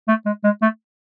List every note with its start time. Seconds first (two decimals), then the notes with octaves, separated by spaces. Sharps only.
0.08 A3
0.26 G#3
0.44 G#3
0.62 A3